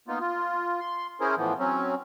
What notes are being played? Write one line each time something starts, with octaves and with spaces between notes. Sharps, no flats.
A#3 B3 D#4 F4
F4
C6
C#4 E4 G#4 A#4 C5
A2 E3 F3 B3
F#3 C4 C#4